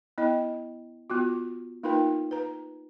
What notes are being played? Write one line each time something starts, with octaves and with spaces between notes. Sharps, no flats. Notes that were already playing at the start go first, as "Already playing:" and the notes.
B3 E4 D#5 G5
B3 F4 F#4
A#3 D#4 F4 A#4 B4 G5
B4 A#5